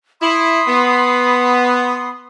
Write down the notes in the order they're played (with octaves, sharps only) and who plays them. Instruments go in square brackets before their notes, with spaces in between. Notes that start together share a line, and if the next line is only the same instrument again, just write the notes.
[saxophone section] E4 [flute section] B5 C6 D#6
[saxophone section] B3